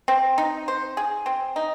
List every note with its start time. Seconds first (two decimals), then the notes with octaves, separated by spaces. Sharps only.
0.08 C4
0.38 D#4
0.68 C5
0.97 G#4
1.26 C4
1.56 D#4